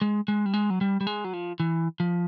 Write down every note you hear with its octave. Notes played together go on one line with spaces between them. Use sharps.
G#3
G#3
G3
G#3
F#3
G3
G3
G#3
F#3
F3
E3
F3